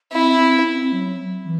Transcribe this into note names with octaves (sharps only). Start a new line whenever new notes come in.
C4 E4
C4
C#4
C4
F#3
E3